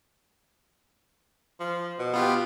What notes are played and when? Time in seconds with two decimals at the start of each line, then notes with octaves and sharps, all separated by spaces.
1.60 F3
1.99 B2
2.14 B3 F4 G4